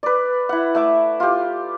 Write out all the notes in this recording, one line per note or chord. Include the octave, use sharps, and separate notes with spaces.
B4 D5
E4 F#5
A3 E5 D6
F4 G4